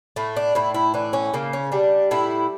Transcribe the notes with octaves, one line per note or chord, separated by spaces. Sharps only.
A2 A3
D4
A2 E4
E4
E3 D4
C#4
C#3 A#3
C#4
G3 D4
A2 E4